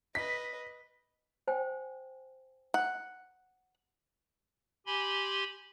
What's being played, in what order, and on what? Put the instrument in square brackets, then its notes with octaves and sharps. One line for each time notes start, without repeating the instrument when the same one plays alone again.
[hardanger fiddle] B4 D#5 [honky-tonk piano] B6
[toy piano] C5 G5 G#5
[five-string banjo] F#5
[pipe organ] G4 G#5 B5 C6